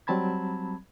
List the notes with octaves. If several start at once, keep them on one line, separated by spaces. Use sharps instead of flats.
F#3 G3 C4 A5 B5 G#6